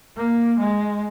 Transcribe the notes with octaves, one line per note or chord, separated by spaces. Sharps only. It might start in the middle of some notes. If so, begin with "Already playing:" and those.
A#3
G#3